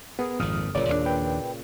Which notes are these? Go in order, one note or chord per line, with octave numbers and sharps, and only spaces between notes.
B3 G#4 A#4
G#1 F2 A#2 D#6 F6
F#1 A#2 C#3 D5
D#2 A3 D4
B4 G5